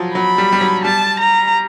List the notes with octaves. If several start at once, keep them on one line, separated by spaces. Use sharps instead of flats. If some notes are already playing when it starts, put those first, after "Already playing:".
Already playing: F3 F#3
F#3 B5
G3
G3
F#3
G3 A5
A#5